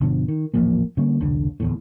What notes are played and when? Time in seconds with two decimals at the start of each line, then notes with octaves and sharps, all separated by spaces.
0.01 G1 B2 D3 F3
0.28 D#3
0.54 D#1 A1 F3 A#3
0.97 D3 G3 A#3 C#4
1.20 E1 C2 D3
1.60 D1 E2 A2